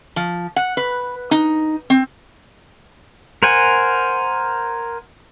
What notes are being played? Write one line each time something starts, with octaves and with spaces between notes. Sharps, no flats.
F3
F#5
B4
D#4
C4
A#4 C5 F#5 G#5